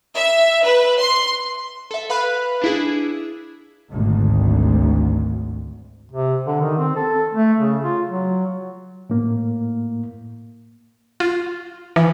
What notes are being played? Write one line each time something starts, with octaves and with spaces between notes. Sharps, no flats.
E5
B4
C6
A4 E5
B4 F5 B5 F#6
D4 E4 G#4
G#1 D2
C3
D3
D#3
C4
A4
A3
C#3
F4
F#3
A2 A#3
F4
E3